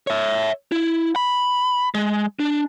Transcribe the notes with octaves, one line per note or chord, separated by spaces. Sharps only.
C#5 E5
E4
B5
G#3
D4